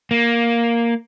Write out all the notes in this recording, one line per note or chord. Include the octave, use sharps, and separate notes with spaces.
A#3